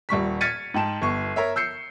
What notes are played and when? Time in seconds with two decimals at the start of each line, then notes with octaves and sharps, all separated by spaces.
0.09 D#1 G3 C#6 B6
0.41 F6 G#6 A6 B6 C#7 D#7
0.74 G#2 G5 A5 E7
1.02 G1 C#6
1.36 A#4 C#5 E5
1.56 E6 G6 C7 C#7